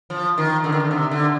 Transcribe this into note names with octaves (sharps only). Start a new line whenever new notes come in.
F3
D#3
D3
D#3
D3
C3
D3